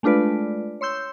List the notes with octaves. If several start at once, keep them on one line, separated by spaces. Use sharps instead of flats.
G#3 A3 D4 F4 B4 D5
C#5 C6 E6 G6